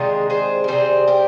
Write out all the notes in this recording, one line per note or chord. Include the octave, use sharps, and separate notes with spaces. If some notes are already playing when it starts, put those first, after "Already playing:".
Already playing: C3 D#3 G#3 D4 F4 G#4
G#4 C5
A#4
C3 D#3 G3 G#4 C5
G4 A#4